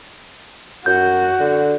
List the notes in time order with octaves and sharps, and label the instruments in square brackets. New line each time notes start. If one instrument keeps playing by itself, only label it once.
[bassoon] F#2 [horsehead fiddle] F#4 [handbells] G6
[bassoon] D3